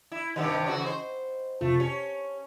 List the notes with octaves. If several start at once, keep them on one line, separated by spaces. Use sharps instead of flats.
E4
G2 C3 D#3 D#5 F#5 E6
C#3 E3 F#4
C5 D#5
F2 C3 A3 F4
C#4 G4